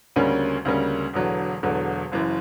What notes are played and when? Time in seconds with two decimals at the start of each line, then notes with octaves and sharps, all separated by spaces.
0.16 D2 C#3 G3 A#3 C#4
0.65 D2 C#3 G3 A#3 C#4
1.13 E1 E2 D3 F#3
1.63 E1 E2 D3 F#3
2.12 F#1 F#2 E3